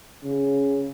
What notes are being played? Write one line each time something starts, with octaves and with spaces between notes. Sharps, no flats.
C#3